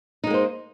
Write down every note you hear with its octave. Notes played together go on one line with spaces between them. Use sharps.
G#3 A#3 D#4 C5